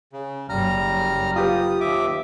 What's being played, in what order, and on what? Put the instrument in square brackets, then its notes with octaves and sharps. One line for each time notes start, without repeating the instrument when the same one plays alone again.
[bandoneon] C#3
[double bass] F#1 F#2 [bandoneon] G3 A#5 F6
[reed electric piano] F4 G4 B4 [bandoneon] D#6
[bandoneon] D#2 E5 D6